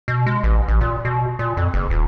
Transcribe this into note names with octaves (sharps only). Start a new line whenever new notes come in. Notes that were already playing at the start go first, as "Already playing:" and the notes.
B2
G#3
A1
A1
A#2
B2
A#2
F2
F#1
D#1